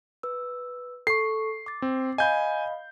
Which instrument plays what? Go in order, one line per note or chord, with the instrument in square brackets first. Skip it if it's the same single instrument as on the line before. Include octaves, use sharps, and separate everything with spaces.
[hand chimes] B4 E6
[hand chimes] A4 C#6 [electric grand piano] C7
[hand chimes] D6 A6
[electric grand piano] C4
[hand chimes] D#5 F5 B5 [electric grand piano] G#5 G6